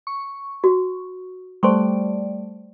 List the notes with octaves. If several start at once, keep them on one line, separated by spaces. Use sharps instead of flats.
C#6
F#4
G3 A3 C5 D5 C6 C#6